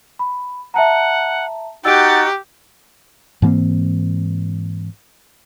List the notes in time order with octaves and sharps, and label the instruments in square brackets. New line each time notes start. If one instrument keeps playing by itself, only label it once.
[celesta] B5
[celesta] E5 A5 A#5 [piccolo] F#5
[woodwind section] D#4 F#4 F#5 [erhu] G4 [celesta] E6 D7 [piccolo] A6
[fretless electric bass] G#2 E3 A#3 C4